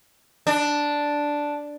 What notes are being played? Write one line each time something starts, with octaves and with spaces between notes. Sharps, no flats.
D4